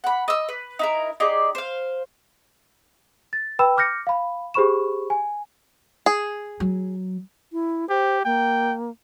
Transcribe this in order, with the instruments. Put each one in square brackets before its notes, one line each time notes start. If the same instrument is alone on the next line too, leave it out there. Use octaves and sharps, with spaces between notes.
[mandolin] F#5 B5
D#5 E6
B4
D#4 E4 A#4
D#4 G4 G#4 D5
C5 F5
[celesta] A6
B4 G5 B5 E6 E7
D6 F6 G6 A#6 C#7
F5 B5
G4 G#4 C5 B5 C#6 E7
G#5
[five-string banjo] G#4
[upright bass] F#3
[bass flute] E4
[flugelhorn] G4 [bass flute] C5
[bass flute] A#3 [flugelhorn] G5